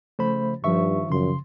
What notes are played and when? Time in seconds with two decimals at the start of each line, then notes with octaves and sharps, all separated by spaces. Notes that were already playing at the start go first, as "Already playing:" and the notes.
0.19 C#3 F3 A3 C5 B5
0.64 G2 D#3 F3 E5 C#6
1.10 F#2 C#3 C6